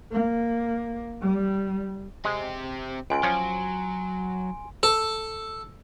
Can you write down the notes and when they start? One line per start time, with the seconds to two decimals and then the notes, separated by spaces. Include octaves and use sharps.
0.12 A#3
1.22 G3
2.25 G#3 C4 G4
3.10 C#2 G#5 C6 D7
3.23 F3 F#3 C#4
4.83 A4